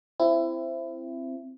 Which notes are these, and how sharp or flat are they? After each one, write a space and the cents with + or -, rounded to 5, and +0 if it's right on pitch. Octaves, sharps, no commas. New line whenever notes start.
C4 +0 E4 +20